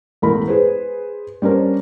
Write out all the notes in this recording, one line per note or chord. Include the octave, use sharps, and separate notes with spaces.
E1 A1 A3 A#4 B5
G#4 B4 C5
G3 C#4 D4 A#4 C5